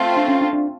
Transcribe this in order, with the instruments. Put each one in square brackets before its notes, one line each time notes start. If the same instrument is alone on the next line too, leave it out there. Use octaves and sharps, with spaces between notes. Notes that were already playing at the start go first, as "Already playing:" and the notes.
Already playing: [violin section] A3 C4 F4
[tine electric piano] D4
C#4
D4
D4